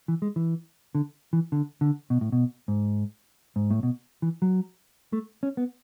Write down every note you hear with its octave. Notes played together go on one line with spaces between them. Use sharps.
E3
G#3
E3
D3
E3
D3
D3
B2
A2
B2
G#2
G#2
A2
B2
E3
F#3
A3
C#4
B3